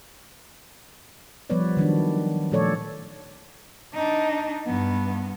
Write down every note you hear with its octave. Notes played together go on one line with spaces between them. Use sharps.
F3 G3 B3 B4 C#5 D5
D#3 F#3 D4
A#2 F3 A3 A4 C#5 D5
D4 D#4
G2 B3